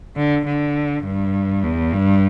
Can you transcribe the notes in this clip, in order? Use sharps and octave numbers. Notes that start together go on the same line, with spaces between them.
D3
D3
G2
E2
G2